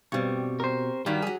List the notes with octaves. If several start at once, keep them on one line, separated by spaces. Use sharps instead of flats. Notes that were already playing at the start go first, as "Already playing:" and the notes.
G2 B2 G3 C4 G4 C#6
A#4 C5
G2 D#3 F#3 G3 B6
F#3 G#4